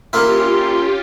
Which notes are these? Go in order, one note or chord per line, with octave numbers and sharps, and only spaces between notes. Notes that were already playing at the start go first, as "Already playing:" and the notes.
A#3 C#4 E4 F4 G4 C6